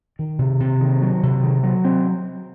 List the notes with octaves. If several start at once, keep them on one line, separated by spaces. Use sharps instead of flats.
D#3
C3
C3
D#3
F#3
C3
D#3
F#3
C4